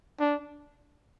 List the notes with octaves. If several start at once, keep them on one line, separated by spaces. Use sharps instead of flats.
D4